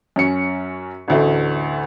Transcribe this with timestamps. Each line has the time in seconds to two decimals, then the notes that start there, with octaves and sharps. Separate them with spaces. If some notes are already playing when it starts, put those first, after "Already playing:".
0.16 F#2 C#4 C#7
1.08 A1 D2 A3